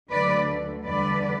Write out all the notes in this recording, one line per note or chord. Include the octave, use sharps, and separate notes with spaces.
D2 D3 F#3 B4 D5
E2 D3 G3 B4 D5